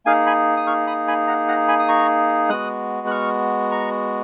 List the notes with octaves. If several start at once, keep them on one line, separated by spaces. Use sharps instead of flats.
A#3 D#4 G#4 F5 G#5
G#5 B5
D#6
C#6 F6
B5 D#6
G#5 B5
F#5 A#5
F#5 A#5
G#5 B5
D#6
A#5 C#6
G#3 B3 F#4 D#6 F#6
F#6
C#6 F6
A#5 C#6